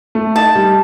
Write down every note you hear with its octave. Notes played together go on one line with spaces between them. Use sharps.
A3
D#4 A5
G3